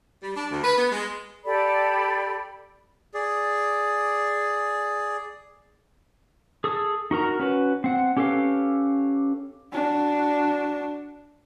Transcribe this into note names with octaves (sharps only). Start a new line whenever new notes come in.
G3
D4
D2
B4
B3
G#3
G4 A4 D5 B5
G#4 D5
G#4 A4 D#6
D#4 F#4 A#4 A#5
C#4 F#4 B4
C4 F#5
C#4 G4 A4 B4 F5
D4 F#4